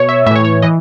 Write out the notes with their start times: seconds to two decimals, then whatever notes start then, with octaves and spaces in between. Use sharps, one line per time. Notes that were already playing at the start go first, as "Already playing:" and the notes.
Already playing: B2 C#5
0.09 E5
0.26 A2 E5
0.31 E3 C#5
0.45 C#5
0.62 E3 D#5